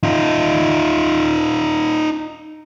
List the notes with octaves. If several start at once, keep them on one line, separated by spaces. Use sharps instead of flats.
D#4 F4